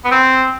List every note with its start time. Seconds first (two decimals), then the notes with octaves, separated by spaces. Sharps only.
0.05 B3
0.11 C4